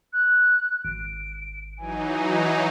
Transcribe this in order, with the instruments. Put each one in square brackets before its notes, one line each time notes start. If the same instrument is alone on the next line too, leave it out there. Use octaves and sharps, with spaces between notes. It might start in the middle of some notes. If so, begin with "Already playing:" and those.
[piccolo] F#6
[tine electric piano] G#1 [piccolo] D7
[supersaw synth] E3 F#3 D#4 [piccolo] G#5